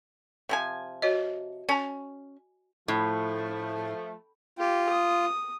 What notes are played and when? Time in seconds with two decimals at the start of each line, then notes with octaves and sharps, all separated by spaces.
0.49 C3 F3 G#5
1.02 F#4 C#5 D#5
1.69 C#4 G#5 A5
2.88 A2 F3 A3
4.59 F4 G4
4.89 D#6